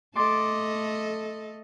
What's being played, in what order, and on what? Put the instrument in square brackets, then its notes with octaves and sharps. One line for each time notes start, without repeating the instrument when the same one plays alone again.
[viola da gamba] A3 A4 D#5 [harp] C6 D6 A6